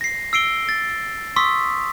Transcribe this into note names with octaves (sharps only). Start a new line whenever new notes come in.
A#6 C7
E6 C7 D7 G7
A6
C6 C#6 D#6 E6 B6